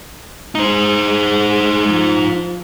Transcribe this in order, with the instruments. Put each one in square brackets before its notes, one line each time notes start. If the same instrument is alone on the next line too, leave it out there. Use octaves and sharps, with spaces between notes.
[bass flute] G#3 [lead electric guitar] D#4 C5
[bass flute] F3